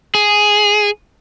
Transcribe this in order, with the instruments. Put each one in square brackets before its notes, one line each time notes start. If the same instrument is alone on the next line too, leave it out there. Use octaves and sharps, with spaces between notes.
[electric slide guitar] G#4